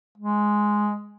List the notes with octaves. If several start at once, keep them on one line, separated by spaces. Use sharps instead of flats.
G#3